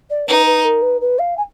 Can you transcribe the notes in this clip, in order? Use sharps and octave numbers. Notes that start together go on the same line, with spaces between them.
D5
D#4 B4
B4
A#4
B4
B4
F5
G#5